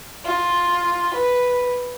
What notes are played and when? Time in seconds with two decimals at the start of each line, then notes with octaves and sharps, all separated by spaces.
0.25 F4
1.13 B4